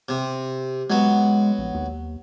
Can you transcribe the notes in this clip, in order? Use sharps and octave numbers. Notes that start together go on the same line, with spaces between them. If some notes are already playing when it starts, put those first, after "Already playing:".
C3
F#3 G#3 B3
A#1
D#2